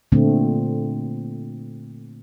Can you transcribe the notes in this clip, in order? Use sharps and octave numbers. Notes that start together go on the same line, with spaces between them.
A#2 D3 A3 C4